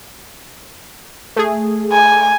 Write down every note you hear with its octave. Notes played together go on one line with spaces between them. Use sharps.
A3 G#4
G#5